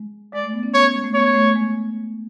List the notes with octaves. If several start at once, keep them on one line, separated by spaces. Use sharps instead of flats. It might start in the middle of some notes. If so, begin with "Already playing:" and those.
Already playing: G#3
G#3 D5
A3
B3
C#4
B3 C#5
G#3
A3
B3 C#5
A3
G#3